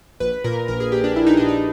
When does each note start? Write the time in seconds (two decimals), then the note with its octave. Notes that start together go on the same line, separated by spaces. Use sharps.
0.20 A#1 B4
0.44 A#2 A#4
0.68 A#1 A#4
0.80 G#4
0.92 A#2 G4
1.04 D4
1.16 A#1 E4
1.26 D#4
1.37 A#2 D4
1.48 D#4